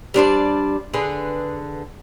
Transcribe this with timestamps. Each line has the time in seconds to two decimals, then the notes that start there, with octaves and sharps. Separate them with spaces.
0.14 G3 D4 C5 D5
0.94 D3 G#4 B4